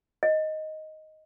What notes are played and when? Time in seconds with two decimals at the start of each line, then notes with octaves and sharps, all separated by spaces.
0.23 D#5